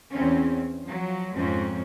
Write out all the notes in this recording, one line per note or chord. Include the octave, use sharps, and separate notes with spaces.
E2 C4 C#4
F3 F#3
F2 G#2 F3 C4 C#4